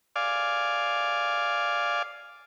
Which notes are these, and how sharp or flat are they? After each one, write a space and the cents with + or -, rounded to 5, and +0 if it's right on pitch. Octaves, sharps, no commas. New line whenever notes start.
D5 +0 F5 +0 G#5 +0